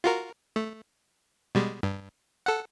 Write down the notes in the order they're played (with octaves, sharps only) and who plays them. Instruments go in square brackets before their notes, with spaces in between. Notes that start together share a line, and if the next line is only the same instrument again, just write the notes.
[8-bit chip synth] F4 F#4 A#4
A3
B2 G3 G#3
G2
A4 F#5